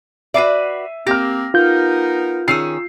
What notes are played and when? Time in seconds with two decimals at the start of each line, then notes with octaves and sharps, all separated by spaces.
0.34 F#4 B4 D5 E5 C7 D#7
1.07 A#3 C4 G4 F6 A#6
1.54 B3 D#4 F4 A#4 G6
2.48 D#3 C#4 G#4 E6 C7